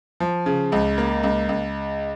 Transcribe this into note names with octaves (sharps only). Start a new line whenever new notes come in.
F3
C#3
C#2
A#3
C#2
C#2